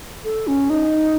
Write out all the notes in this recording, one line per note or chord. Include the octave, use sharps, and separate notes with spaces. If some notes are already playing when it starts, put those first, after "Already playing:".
A4
C#4
D#4